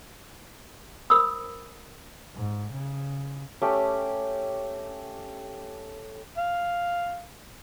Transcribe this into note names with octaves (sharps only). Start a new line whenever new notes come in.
A#4 C5 B5 D#6 E6
G#2
C#3
A3 C#4 G4
F5